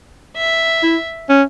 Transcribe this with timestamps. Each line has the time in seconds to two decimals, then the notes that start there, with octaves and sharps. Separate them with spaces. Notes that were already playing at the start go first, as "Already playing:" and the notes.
0.36 E5
0.83 E4
1.29 C#4